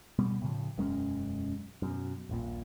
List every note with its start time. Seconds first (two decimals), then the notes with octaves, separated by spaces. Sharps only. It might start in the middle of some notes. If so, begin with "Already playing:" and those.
0.19 B2 G3 B3
0.42 A2 C#3 E3 F3
0.78 E1 F#2 G#3 C#4
1.82 F#2 B2
2.29 D#1 A#1 A#2